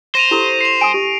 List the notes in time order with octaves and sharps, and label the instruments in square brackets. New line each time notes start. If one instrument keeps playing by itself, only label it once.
[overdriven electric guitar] C5 [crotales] A#6 D#7 F7
[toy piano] E4 G4 A4
[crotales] C7 F7
[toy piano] G#5 D#6 [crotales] D7
[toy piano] G4